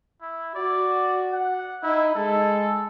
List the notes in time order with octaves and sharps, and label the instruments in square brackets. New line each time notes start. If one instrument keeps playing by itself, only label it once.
[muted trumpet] E4
[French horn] F#4 [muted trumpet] D5
[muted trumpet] F#5
[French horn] D#4 [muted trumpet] E4
[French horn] G#3 [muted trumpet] A4